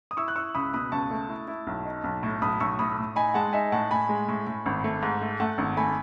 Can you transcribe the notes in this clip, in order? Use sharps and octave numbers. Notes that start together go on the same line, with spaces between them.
D#6
E4 C#6 E6
F#6
E4 C#6 E6
C#2 B5 D#6
B2 B5 D#6
C#2 A5 C#6
A3
E4
E4
B1
D#4
B1
A2
B1 B5 D#6
B1 C#6 E6
A2 B5 D#6
A2
D#4 G#5 B5
G#3 F#5 A5
D#4 E5 G#5
A2 F#5 A5
A2 G#5 B5
G#3
A2
A2
G#1
A3
G#2
A3
A3 F#5 A5
G#1
A3 G#5 B5